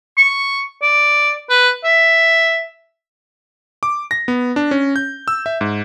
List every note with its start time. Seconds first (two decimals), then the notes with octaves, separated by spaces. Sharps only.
0.17 C#6
0.82 D5
1.49 B4
1.84 E5
3.83 D6
4.11 A#6
4.28 B3
4.56 D4
4.71 C#4
4.96 G6
5.28 E6
5.46 E5
5.61 G#2